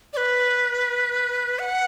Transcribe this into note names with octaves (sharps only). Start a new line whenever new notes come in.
D5
B4
F#5